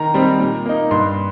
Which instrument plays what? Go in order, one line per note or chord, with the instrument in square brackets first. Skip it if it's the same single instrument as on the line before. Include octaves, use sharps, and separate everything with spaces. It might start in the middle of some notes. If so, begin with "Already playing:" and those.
Already playing: [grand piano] D#3 A#5
G3 C4 D#4
A#2
A#3 D#4
G2 C6